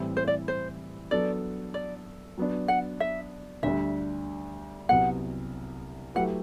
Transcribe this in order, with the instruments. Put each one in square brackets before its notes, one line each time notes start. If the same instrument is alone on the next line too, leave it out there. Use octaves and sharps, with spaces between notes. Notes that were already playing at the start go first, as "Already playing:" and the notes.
Already playing: [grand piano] A2 E3 G3 C4 E4
[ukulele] C5
D5
C5
[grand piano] F#3 B3 D4 A4 [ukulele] D5
[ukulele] D5
[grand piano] F#3 B3 D4
[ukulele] F#5
E5
[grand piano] D2 D3 G3 D4 [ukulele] E5
[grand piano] C2 C3 F#3 B3 [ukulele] F#5
[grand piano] F#3 A3 E4 G4 B4 [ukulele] F#5